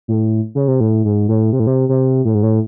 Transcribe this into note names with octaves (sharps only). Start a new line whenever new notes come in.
A2
C#3
C3
A2
G#2
A2
C3
A2
C3
C3
A2
G#2
A2